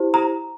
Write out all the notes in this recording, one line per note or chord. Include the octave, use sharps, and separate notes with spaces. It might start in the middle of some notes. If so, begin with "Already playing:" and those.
Already playing: E4 G4 C5
A#5